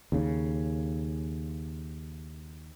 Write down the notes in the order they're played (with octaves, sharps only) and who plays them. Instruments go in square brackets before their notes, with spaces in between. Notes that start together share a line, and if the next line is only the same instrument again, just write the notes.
[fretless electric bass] D#2 C#3